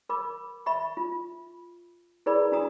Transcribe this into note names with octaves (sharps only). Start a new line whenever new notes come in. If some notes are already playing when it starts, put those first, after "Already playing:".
A#4 B5 D6
E5 B5 C#6
F4
E4 G#4 A#4 B4 D5 B5
D4 F#4 A#5 D#6